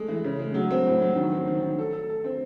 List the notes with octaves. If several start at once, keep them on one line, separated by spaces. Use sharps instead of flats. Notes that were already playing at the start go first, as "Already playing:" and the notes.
Already playing: G#3 A3
E3
C#3
G#3
F#3
C4
A2
F#3
D#3
C4
D#3
D#3
A4
A4
A4
C4